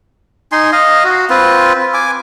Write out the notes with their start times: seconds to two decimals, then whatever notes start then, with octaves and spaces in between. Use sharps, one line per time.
0.52 D#4 G#5 C6
0.72 D#5 F5
1.04 F#4
1.30 C4 F4 B4
1.94 G#5 D6